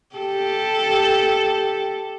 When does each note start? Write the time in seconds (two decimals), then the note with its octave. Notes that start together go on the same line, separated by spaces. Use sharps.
0.15 G4 A4